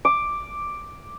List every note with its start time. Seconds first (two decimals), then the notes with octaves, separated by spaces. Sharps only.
0.05 D6